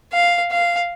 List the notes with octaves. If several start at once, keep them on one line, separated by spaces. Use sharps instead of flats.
F5
F5